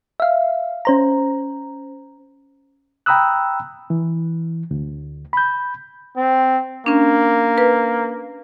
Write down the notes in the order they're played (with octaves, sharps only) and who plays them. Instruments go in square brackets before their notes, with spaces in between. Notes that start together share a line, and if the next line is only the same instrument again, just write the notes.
[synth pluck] E5 F5
C#4 C5 A#5
[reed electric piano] G5 A#5 B5 D#6 E6 F#6
E3
D2
B5 G6
[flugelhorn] C4
[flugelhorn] A#3 [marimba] C#4 D4
[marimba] B4